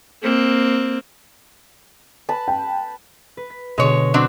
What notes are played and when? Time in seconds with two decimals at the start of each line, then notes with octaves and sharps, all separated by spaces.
0.23 A#3 C4
2.29 B4 A5
2.48 G5
3.37 B4
3.50 B6
3.78 B2 D3 G#3 C#5
4.14 F#3 C4 D4